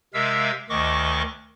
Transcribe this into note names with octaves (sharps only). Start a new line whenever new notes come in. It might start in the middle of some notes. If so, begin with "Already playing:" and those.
C3 G#3 A#4 E5 F5 E6
D2 D#3 D#5 C#6 D6